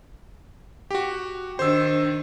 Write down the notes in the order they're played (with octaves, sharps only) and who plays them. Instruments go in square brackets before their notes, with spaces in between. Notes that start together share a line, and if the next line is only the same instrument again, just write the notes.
[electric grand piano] F#4 G4
[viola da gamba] D#3 D4 [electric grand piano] C5 E6